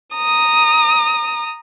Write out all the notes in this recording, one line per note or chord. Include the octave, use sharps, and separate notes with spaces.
A#5 D#6